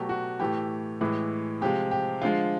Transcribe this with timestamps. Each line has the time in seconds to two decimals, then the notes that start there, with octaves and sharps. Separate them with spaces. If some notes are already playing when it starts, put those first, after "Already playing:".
Already playing: B2 F#3 A3 G4
0.09 F#4
0.40 A2 E3 A3 G4
1.01 A2 E3 G#3
1.61 C3 F3 G#3 G4
1.91 G4
2.22 D3 F3 G#3 F4